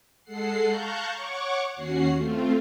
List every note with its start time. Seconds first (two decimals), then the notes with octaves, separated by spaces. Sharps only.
0.23 G#3 A4 F#5 C7
0.65 F5 A5 A#5 C#6 F#6 G6
1.14 C#5 F#5 C#6 D6
1.75 D#2 C#4 F#4 F#5 C7
2.16 A3 C4 F4